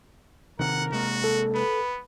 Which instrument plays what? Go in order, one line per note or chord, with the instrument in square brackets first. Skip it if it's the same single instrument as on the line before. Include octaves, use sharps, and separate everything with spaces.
[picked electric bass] C3 D#3 [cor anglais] A#4 [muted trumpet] F#5
[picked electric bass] C3 G#3 A#3 [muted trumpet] F#4
[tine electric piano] A4
[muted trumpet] B3 [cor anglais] B4